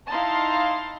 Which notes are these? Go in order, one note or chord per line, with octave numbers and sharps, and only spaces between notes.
D#4 E4 F5 A5 A#5 C6